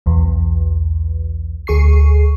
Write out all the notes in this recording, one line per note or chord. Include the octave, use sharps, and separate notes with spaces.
B1 E2
D2 G#4 C#6 C7